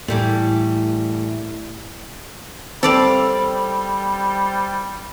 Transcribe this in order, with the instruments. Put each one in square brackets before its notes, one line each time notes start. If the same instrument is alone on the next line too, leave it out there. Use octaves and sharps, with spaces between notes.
[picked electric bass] A2 [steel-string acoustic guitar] E3 G3 A3
[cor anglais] G3 [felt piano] C4 [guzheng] A4 D5 F5